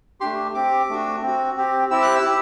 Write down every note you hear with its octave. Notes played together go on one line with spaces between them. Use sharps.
A3 D4 G4 C6
C4 G4 D6
A3 D4 F#4
C4 F#4
C4 G4
C4 E4 G4 E6
F#6
E6
E4 G4